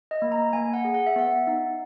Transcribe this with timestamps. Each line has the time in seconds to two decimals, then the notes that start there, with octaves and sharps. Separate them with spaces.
0.11 D#5
0.22 A#3
0.32 A#5
0.53 A#3 G#5
0.74 F#5
0.85 G#4
0.94 F#5
1.06 E5
1.16 B3 F#5
1.47 D#4